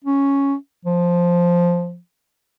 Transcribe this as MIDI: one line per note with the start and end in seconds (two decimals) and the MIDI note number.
0.05 0.54 61
0.85 1.98 53